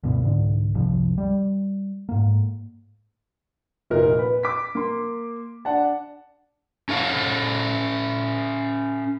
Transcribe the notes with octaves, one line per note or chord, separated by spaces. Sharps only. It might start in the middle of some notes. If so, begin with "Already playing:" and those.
D2 G2 B2 B3
C2 G#2 D3
F#1 C2 C3 F3
G3
G#2 A#3
F1 A#2 D#4 A#4
B4
D6 B6
A#3 C6
D4 F#5 A5
C#4 A4 F5 F#5